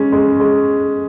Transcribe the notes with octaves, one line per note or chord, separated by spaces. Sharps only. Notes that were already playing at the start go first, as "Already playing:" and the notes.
Already playing: G#3 C#4
G#3
G#3